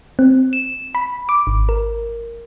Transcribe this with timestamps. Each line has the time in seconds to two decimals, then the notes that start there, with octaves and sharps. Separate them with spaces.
0.19 C4
0.53 E7
0.95 B5
1.29 D6
1.47 G#1
1.69 A#4